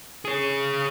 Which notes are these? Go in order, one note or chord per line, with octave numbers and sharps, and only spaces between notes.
G#4 C#5